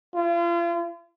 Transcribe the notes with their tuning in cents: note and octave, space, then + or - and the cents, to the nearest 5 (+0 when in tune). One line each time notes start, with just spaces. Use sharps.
F4 -40